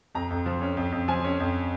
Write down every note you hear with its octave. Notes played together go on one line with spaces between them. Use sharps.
F2 A#5
F2
F3
C#4
F2
F2
F3 G#5
C#4
F2